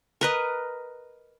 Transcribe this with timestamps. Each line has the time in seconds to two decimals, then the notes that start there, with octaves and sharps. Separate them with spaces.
0.21 A#4 B4 D#5